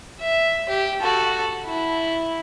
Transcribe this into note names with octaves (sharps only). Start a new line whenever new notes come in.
E5
G4
F#4 A4
E4